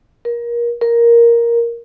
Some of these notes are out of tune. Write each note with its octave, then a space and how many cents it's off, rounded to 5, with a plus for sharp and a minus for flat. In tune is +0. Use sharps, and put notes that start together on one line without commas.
A#4 +25
A#4 +5